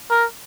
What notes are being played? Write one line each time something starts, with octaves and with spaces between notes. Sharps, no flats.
A#4